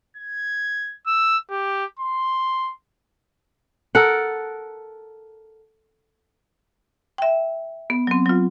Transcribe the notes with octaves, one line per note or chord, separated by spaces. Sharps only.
G#6
E6
G4
C6
A4 A#4 F#5
E5 G5
B3
F#3 C4
F#3 F4